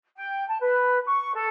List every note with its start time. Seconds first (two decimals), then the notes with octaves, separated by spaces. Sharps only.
0.16 G5
0.48 A5
0.60 B4
1.06 C#6
1.35 A4